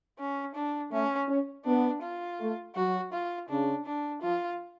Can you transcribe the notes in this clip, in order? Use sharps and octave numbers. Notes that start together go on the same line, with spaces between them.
C#4
D4
A3 C#4
C#4
B3 D4
F4
A3
F#3 F#4
F4
C#3 D4
D4
F3 F4